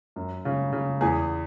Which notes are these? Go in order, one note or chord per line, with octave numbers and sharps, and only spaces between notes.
F#2
C#3
C#3
E2 G#4